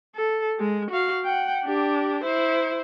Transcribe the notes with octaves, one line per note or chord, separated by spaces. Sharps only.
A4
G#3
F#4 F5
F#5 G5
D4 G4
E4 C5